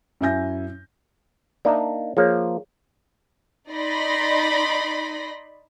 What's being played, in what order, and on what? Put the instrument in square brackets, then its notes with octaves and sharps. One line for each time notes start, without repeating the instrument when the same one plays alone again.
[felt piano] F#2 E4 E5 G#5 G6 A#6
[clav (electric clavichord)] A#3 D4 D#4 [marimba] D5 E5 A#5
[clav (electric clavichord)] F3 A#3 [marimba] G#4 C#5
[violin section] D#4 D5 D#5 B5 C6 A#6